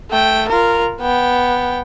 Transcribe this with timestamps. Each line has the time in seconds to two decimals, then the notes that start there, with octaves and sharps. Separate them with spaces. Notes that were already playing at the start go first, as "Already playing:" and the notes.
0.11 A3 G5
0.49 F4 A#4
1.01 B3 G5